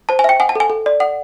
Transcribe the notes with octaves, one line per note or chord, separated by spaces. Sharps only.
C5 A5
G#5
E5 G5
F#5 G#5
A5
A4 G#5
A4
D5
F#5